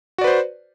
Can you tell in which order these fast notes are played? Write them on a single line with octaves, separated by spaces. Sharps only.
F#4 D5 B4 C5